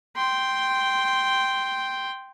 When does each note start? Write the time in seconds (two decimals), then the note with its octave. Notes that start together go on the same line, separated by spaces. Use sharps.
0.17 G5 C6